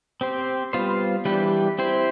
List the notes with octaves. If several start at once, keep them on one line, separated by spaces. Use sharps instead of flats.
C4 G4 C5
G3 B3 F4 C5
E3 G3 D4 G4 B4
C4 E4 G4 C5